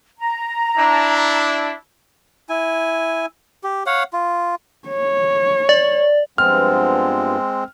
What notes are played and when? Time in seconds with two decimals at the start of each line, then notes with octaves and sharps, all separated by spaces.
0.19 A#5
0.77 D4 E4
2.49 E4 G#5
3.64 G4
3.86 C#5 F5 F#5
4.13 F4
4.88 C#5
5.69 D5
6.38 G2 F3 G#3 B3 C4 F6